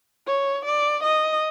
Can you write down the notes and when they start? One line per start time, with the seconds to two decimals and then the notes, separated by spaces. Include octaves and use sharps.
0.27 C#5
0.65 D5
1.04 D#5